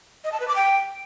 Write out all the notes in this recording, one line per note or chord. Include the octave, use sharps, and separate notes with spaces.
D#5
A5
B4
D6
G5